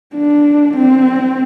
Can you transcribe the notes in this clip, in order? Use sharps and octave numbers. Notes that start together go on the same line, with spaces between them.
D4
C4